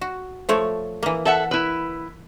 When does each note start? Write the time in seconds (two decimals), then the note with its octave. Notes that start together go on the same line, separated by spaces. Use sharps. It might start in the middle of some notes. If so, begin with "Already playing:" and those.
0.01 F#4
0.49 F3 A3 C#5
1.03 E3 A#3
1.25 A4 E5 F#5
1.51 E4 B4